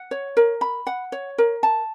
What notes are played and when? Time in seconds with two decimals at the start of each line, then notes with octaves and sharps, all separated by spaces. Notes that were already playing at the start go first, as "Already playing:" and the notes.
Already playing: F#5
0.11 C#5
0.37 A#4
0.61 B5
0.87 F#5
1.12 C#5
1.38 A#4
1.63 A5